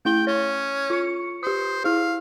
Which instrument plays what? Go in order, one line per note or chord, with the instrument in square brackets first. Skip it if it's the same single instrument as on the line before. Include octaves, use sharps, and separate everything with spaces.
[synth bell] A3 E4 G7 [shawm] G5
[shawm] C#4 [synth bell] C#5
[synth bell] F4 C#6 C#7
[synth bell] G4 D#6 [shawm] C5
[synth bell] E4 G#4 [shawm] F5